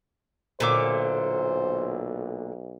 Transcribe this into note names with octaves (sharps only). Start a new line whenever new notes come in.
B1 A#2 D3 C5 E5 D6